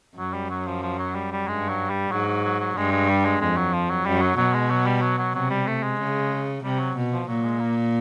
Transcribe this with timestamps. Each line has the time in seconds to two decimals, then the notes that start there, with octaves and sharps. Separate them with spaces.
0.18 F#2 F#3
0.34 G3
0.50 F#3
0.67 F3
0.83 F3
0.99 F#3
1.15 G3
1.32 G3
1.47 G2 G#3
1.69 F#3
1.90 G3
2.11 G#2 F#3
2.28 F#3
2.44 F#3
2.61 F#3
2.77 G2 G#3
2.92 G#3
3.09 G3
3.25 G#3
3.41 F2 G#3
3.57 F#3
3.74 F3
3.90 F#3
4.06 F#2 G3
4.22 F#3
4.37 B2 F#3
4.54 G#3
4.70 F#3
4.86 G3
5.02 F#3
5.18 F#3
5.34 C3 F#3
5.50 G3
5.67 A3
5.83 G#3
5.99 C#3
6.63 C3 G3
6.79 F#3
6.96 B2
7.12 F3
7.28 A#2 F#3
7.44 G#3
7.60 A#3